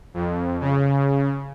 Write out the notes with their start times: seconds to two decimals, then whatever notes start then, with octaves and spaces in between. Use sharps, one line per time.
0.14 F2
0.60 C#3